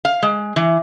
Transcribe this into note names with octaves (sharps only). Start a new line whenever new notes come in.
F5
G#3
E3